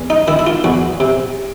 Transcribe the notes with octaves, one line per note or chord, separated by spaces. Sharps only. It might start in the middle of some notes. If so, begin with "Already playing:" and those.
Already playing: E2
D#4
D#3 E4
E4
F4
E2 F#4
C3